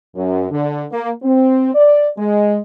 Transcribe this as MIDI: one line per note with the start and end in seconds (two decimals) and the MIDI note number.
0.15 0.46 42
0.51 0.83 50
0.91 1.11 58
1.23 1.75 60
1.75 2.09 74
2.18 2.59 56